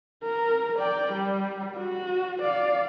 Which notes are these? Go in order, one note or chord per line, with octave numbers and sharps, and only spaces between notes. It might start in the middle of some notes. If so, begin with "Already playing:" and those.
A#4
D5 G5
G3
F#4
D5 F5